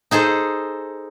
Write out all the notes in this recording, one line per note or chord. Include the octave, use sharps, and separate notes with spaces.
D#4 G#4 A4 C5